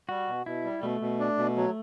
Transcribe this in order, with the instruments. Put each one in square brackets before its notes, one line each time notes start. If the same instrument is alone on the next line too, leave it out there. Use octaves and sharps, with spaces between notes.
[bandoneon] G3 [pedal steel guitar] F#4
[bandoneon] B2
[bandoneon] B2 [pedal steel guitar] E4
[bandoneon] G3
[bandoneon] B2 [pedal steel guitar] A3
[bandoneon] B2
D4
B2
F#3